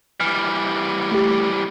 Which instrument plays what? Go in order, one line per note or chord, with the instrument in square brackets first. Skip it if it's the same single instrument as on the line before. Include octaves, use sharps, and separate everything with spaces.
[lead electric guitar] E3 G3 [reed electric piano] F6
[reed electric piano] A3 G4